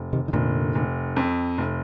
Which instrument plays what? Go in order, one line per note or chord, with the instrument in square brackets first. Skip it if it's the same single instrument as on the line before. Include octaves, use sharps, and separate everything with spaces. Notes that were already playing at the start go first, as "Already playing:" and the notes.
Already playing: [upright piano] F1
[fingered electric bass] C3 D#3
D#3
[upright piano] F1 [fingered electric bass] A#2 D3
[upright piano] F1
F2
F1